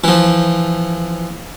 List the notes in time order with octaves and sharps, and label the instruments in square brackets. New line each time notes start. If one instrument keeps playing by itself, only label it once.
[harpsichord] E3 F3